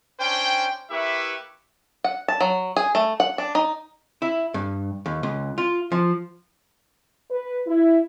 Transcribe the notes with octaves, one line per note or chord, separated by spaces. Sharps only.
C#4 D4 C5 G5
A#3 E4 G4 B4 E5 C#6
F#5
A5
F#3
G#4
A3
F#5
D4
D#4
E4
G2
D#2
C#2
F4
F3
B4
E4